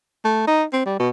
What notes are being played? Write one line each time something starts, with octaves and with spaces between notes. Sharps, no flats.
A3
D#4
C4
G3
B2